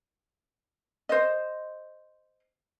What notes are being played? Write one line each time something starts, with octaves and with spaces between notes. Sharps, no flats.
C5 D#5